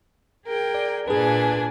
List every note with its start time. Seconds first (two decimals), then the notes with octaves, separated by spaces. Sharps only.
0.45 G#4 A#4 G5
0.74 D5
1.08 A#2 D4 G#4 B4 G#5